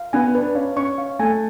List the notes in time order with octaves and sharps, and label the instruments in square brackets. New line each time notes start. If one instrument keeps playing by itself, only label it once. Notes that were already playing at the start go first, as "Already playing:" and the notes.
Already playing: [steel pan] F5
[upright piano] B3 [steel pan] G#5
[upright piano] D4 [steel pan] B4
[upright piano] C#4 [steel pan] F5
[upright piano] C#4 [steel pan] C#6
[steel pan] F5
[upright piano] A3 [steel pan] G#5